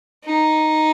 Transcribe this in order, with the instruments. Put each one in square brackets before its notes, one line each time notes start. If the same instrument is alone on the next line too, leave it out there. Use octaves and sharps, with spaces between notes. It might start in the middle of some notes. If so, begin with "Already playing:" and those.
[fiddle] D#4